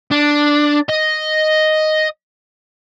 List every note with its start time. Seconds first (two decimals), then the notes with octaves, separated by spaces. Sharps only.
0.11 D4
0.89 D#5